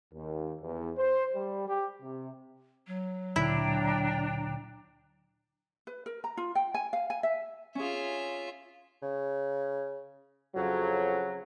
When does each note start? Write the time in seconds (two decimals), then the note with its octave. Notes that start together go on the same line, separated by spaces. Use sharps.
0.13 D#2
0.62 E2
0.97 C5
1.33 G3
1.69 G4
2.01 C3
2.87 F#3
3.36 D2 A#2 D3 D4 E4 G5 A#5
5.87 B4
6.06 A#4
6.24 A#5
6.37 F4
6.55 G5
6.74 G#5
6.93 F5
7.10 G#5
7.23 E5
7.75 C#4 F4 G#4 E5
9.02 C#3
10.56 F2 C#3 F#3